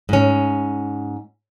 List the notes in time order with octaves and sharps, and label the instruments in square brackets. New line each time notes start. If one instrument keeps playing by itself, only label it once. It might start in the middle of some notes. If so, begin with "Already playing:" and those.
[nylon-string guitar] G#2 C#4